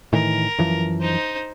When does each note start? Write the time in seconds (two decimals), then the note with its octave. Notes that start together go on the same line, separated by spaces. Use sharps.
0.13 A2 D#3 E3 A#4
0.59 F#2 E3 F3
1.00 D#4 C5